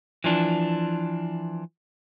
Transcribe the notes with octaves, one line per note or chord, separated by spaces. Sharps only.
E3 F3 D4